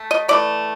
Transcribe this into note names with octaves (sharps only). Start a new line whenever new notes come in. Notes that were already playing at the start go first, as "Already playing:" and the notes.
Already playing: A3
D#5
E3 A3 D5